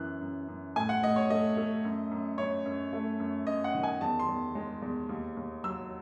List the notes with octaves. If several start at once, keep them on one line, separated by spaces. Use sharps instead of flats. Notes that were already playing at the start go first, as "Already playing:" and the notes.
Already playing: F#2 E3 F#6
F#2
F#2
A2 G#5
F#5
A2 D#5
C#5
A3 D#5
A3
F#2
F#2
F#2 C#5
F#2
A3
F#2
F#2 D#5
F#5
D#3
G#5
E2 A5
C6
E2
G#3
E2
D#2
D#2
F#3 E6